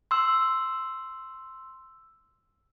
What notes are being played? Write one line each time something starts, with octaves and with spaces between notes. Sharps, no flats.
C6 E6